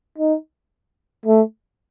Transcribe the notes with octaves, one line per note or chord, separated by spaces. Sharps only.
D#4
A3